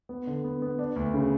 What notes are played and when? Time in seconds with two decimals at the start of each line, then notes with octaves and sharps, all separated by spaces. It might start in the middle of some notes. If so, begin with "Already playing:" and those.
0.09 B3
0.27 D3
0.44 B3
0.62 B3
0.79 D4
0.96 D2
1.14 C#3